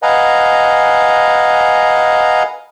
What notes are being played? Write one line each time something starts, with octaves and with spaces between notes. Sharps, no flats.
B4 D#5 F5 F#5 G#5 A#5